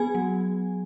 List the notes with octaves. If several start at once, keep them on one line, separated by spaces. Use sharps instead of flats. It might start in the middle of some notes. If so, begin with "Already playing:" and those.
Already playing: B3 G#4 G#5
F#3